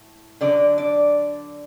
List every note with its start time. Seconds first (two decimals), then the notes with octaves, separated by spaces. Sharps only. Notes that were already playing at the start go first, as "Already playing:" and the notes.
Already playing: A2
0.41 D3 F#3 D4 D5
0.78 D5